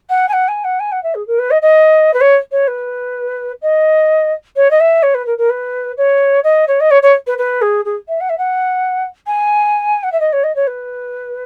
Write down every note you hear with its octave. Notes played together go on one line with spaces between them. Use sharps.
F#5
G#5
F#5
G#5
F#5
G#5
F#5
E5
G#4
A#4
B4
D#5
D#5
B4
C#5
C#5
B4
D#5
C#5
D#5
E5
C#5
B4
A#4
A#4
B4
C#5
D#5
C#5
D#5
C#5
C#5
B4
B4
G#4
G#4
E5
F#5
E5
F#5
G#5
F#5
E5
D#5
C#5
D#5
C#5
B4